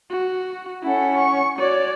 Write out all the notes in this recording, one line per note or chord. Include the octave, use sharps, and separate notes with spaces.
F#4
C#4 E4 A4 F#5
C#6
F#4 C#5 D5